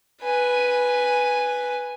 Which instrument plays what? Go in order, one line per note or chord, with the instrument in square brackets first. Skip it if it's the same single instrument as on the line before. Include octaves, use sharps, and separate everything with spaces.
[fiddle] B4 G#5